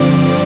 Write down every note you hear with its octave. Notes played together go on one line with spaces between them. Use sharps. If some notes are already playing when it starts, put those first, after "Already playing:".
Already playing: G2 D3 F3 C4 D5 D6